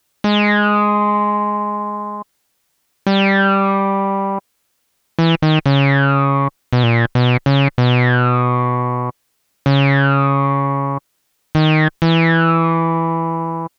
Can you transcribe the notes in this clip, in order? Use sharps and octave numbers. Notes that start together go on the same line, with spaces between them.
G#3
G3
E3
D#3
C#3
B2
A#2
B2
C#3
B2
C#3
D#3
E3